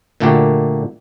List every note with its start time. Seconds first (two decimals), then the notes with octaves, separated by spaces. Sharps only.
0.20 A#2 D3 A3 A#3 F#4 G4